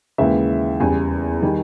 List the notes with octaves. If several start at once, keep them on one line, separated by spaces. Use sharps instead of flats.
D#2 C#3 E3 G#3 E5
E2 C#3 G3 G#5
D#3 G3